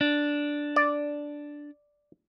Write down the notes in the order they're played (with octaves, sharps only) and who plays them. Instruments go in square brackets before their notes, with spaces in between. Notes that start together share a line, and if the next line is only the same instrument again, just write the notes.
[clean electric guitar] D4
[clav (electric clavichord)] D5